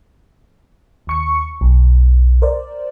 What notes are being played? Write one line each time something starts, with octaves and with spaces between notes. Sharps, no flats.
D#2 C#6 C#7
B1
A#4 C5 D5